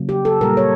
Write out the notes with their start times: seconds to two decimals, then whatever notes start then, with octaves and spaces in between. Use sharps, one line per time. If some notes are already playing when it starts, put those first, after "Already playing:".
Already playing: C#3 F#3 A#3
0.09 G4
0.25 A4
0.41 A#2 G3 A#3 A#4
0.57 C#5